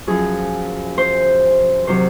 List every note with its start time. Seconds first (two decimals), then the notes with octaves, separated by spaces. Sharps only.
0.07 F#2 F3 G#4
0.98 C5
1.87 C3 D#3 F#3 C5